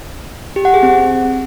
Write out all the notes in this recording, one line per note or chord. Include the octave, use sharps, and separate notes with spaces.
G4
F#5
G#4
C4